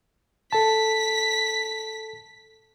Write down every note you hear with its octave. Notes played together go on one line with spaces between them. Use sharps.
A4 A5 B6